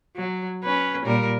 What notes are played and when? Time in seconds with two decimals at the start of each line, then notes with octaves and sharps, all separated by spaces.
0.16 F#3
0.64 C#4 B4
1.05 A#2 G3 A#4